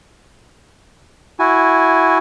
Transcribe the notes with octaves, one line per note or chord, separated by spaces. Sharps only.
E4 F#4 G#5